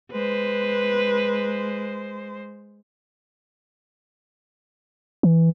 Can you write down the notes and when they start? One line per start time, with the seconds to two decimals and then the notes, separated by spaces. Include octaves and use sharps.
0.12 G#3 B4 C5
5.23 E3